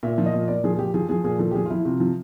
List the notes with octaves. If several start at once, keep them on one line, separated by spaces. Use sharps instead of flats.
A#2 E5
F3
D#5
A#2
A#2 D5
F3 G#4
G#4
F3 G4
F3 G#4
F3 G#4
A#2 G#4
F3 A4
G4
F3 G#4
F4
F3 E4
C3 F4
F3